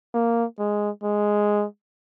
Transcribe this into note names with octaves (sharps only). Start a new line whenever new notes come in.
A#3
G#3
G#3